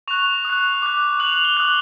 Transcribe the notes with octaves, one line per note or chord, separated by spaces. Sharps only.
C#6 F#6 F7
D#6
F#6
D6 F#6
D#6 F#6 F#7
F7
F#7
G7
D#6 F#6